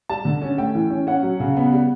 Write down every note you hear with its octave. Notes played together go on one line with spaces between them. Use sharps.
G3 A5
D3
C#4
A3 G5
E3
C#4
C#4 F#5
F#3
C#3
B3
G3